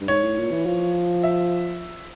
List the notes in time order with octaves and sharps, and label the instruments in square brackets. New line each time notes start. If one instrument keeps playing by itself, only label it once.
[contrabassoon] G2
[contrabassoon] G#2 [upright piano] C#5
[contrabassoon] A2
A#2
E3
F3
[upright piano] E5